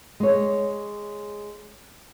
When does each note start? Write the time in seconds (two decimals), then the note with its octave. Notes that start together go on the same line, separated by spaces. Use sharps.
0.20 G#3 C#5